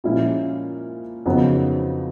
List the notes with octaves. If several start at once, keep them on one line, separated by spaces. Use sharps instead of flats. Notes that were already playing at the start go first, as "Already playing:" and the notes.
A#2 F3 G#3 C#4 E4
F2 C#3 F#3 B3 D#4